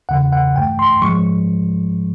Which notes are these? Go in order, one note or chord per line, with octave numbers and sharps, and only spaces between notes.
E2 C#3 E3 F#5
F#5
G2 E3 A3 G5
C6
G#2 F3 G#3 C#6